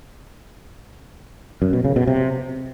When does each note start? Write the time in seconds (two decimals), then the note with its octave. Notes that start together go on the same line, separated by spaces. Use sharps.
1.62 F#2
1.73 B2
1.85 C#3
1.96 B2
2.07 C3